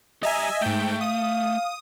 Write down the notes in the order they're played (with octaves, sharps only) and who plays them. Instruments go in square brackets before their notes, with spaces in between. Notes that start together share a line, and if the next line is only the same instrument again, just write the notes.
[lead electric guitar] G3 A#5 [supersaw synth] D#5 E5 G#5
[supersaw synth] G#2 G5 [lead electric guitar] A3
[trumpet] F5 [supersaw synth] D#6